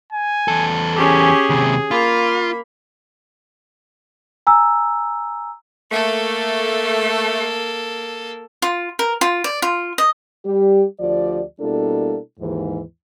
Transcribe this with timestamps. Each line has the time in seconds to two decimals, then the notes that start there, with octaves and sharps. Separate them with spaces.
0.12 G#5
0.48 E2 A4
0.96 C#4 G4 G#4
1.50 D#2 C3
1.91 A#3 F4 B5
4.47 G#5 A#5 E6
5.92 A3 A#3 A4
8.62 F4
8.99 A#4
9.21 F4
9.44 D5
9.62 F4
9.98 D#5
10.45 G3 G4
10.99 D2 F3 G4 D5
11.60 B2 G3 A#3 D4 E4 A4
12.39 D#2 G#2 E3